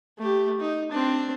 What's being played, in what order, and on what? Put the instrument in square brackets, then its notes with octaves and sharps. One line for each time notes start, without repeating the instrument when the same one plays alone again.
[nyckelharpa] A3 G4
D#4
C4 D4